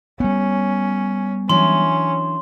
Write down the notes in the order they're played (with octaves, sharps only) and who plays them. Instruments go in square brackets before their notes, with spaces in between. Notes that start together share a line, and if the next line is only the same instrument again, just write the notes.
[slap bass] G3 B3 [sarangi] C#4
[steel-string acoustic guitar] E3 F#3 D4 [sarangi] C#4 [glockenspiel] C6